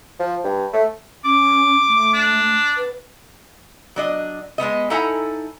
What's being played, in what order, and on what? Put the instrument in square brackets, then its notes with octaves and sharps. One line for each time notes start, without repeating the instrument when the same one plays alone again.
[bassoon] F3
G2
A3
[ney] C#4 [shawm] D6
[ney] A3
[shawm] D4
[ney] B4
[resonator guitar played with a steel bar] F#3 D4 D#5
G#3 A3 B3 D#5
D#4 E4 A4 F#5 G#5 A#5